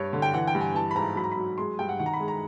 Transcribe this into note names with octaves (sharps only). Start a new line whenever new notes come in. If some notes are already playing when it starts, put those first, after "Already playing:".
Already playing: G2 C#5
D3
G5
E3 F#5
G5
G2
G#5
E3 A5
B5
G#2 A#5
F#3 B5
A#5
B5
F#3
G#3 C6
G2 G5
F#5
D#3 F#5
A#5
B5
G#3
A#5